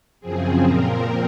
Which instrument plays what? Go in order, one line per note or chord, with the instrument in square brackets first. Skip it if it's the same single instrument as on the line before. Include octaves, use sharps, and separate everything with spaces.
[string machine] F#2 C#3 F3 C4 G#4
A#2 F3 C4 A#4